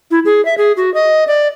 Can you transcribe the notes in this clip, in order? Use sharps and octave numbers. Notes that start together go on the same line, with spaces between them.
E4
G#4
E5
G#4
F#4
D#5
D5